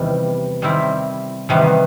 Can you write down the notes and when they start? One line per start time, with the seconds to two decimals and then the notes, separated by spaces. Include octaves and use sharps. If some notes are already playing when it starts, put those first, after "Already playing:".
Already playing: E2 C3 D#3 G3
0.62 D#3 G3 C4 E4
1.49 E2 C3 D#3 G3 B3